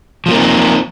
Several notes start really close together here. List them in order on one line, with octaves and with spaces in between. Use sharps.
F3 G#3 A#3 C4 D#4